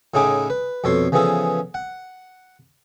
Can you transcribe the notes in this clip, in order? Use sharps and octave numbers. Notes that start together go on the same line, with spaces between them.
A2 C#3 D#4 E4 G#4 D6
B4
F2 B2 A4 C#5 C6
C#3 E3 F3 B3 G#4 A4
F#5